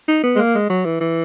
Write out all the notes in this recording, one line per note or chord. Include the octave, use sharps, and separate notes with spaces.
D#4
B3
G#3
A#3
G#3
F#3
E3
E3